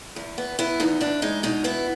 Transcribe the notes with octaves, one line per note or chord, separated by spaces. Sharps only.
E2
B3
B3 E4
E2 D#4
E2 D4
G#3 D#4
B2 D#4
B3 E4